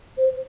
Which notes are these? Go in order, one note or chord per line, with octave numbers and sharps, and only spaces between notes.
C5